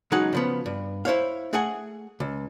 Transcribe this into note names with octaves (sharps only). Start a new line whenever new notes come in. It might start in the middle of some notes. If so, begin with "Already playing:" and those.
C#2 F#3 D#4 G#4 F#5
C#3 F3 B3
G2
E4 C5 C#5 F5
A3 G#4 F#5 G#5
C#2